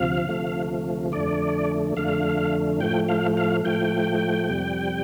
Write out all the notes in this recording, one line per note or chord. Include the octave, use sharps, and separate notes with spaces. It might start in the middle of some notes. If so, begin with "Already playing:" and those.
Already playing: D2 C3 F3 F5
D2 C3 F3 A3
F2 D3 A3 D5
F2 D3 A3 F5
A2 F3 A3 G5
F5
F5
A2 F3 A3 G5
F2 C3 G3